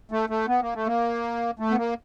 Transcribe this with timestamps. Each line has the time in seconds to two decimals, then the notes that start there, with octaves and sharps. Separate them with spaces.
0.11 A3
0.30 A3
0.48 B3
0.61 A#3
0.75 A3
0.86 A#3
1.59 A3
1.71 B3
1.78 A#3